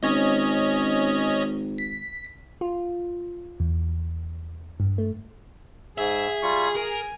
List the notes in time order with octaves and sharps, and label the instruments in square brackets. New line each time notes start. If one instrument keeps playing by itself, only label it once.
[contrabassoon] G#1 [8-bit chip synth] C#4 C#5 D#5
[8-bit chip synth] B6
[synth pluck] F4
E2
G2
A3
[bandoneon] G#2 E6 [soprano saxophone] G#4 [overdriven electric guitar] E5
[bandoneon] G3 F4 C#6
[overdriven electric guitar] A#4 [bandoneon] G#5